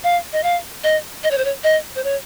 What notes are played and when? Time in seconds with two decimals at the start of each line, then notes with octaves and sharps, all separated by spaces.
0.04 F5
0.33 D#5
0.43 F5
0.84 D#5
1.24 D#5
1.31 C#5
1.38 C5
1.45 C#5
1.64 D#5
1.95 C5
2.04 C#5